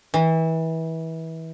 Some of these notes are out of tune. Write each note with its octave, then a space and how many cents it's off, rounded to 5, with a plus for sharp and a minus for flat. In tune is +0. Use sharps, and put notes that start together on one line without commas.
E3 -25